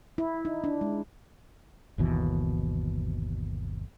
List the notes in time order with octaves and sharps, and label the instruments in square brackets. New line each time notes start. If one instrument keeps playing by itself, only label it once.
[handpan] E4
D#4
D4
G#3
[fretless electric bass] G1 D#2 B2 E3